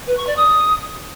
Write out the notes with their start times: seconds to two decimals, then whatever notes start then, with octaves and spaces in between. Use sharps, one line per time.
0.06 B4
0.16 C#6
0.26 D5
0.36 D#6